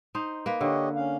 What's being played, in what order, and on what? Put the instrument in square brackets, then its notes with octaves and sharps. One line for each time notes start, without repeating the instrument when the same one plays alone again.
[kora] D#4 C5
A#3 B4
[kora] D3 [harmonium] G4 C#5 D#5
[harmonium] C#4 F5